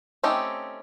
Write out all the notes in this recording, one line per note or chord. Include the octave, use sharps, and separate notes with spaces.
A3 C4 C#4 D#4 G4